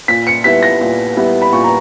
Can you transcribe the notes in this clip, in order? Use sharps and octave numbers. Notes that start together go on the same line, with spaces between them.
A#2 B6
C#7
G3 B3 E4 B6
A#6
A#2
G3 B3 E4
B5
A#2 C#6
A#5